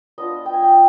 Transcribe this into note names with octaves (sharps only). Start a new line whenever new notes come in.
B3 D4 F4 D#5
G5
G#5
G5
F5